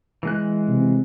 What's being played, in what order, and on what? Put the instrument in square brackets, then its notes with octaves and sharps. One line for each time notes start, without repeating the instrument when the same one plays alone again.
[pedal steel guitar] E3 G#3 F#6
[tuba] C3